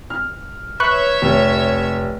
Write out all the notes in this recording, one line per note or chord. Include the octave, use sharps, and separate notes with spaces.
F6
B4 C#5 E5 C#6 F#6
F1